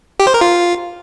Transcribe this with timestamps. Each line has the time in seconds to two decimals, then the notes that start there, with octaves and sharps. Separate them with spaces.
0.20 G4
0.27 C5
0.34 A#4
0.41 F4